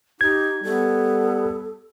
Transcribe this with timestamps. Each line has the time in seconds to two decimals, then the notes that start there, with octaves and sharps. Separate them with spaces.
0.21 D#4 G4 G#6
0.63 G3 B3 A4